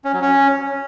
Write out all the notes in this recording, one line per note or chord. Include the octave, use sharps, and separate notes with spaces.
C#4
F#3
C#4